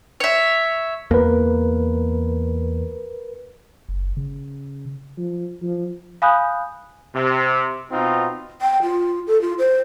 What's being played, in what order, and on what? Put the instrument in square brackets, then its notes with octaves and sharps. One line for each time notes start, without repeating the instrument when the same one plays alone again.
[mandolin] C#5 E5
[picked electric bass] E2 A#3 [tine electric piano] A#4 B4
[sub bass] F#1
C#3
[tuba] F3
F3
[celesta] F5 G#5 B5 D#6 F#6 G6
[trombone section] C3
B2 C4 D#4 F4
[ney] G5
F4
A4
F4
C5